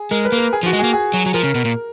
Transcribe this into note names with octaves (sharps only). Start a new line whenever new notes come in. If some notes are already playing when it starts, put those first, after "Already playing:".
Already playing: G#4
G#3 A#4
B4
A#3
A#4
G#4
F3
F#4
G#3
G#4
A#3
G#4
F#3
F#3
F3 A#4
C#3
B2
A#2